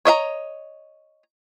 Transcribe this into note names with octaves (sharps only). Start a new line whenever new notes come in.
C#5 D#5 E5 A#5